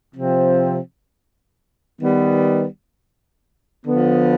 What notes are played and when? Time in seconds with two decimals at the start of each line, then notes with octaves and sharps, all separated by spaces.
0.13 C3 F3 C4
1.99 D#3 G3 B3
3.85 D3 F3 B3